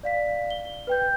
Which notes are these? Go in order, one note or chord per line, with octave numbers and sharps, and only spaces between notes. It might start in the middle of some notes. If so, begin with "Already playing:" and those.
D5 F5 B6
G7
B4 G5 G6